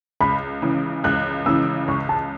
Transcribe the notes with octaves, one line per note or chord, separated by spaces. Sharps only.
C#2 B5
C#3 E3
C#2 F#6
C#3 E3 E6
C#2 C#6
A5